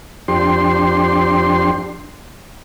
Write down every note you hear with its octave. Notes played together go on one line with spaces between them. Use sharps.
F2 D4 G4 C6